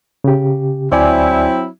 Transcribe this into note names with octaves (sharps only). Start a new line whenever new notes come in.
C#3 G4
D2 F#3 C4 E4 D5 G#5